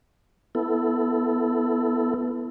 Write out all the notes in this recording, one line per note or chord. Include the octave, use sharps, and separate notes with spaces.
B3 E4 A4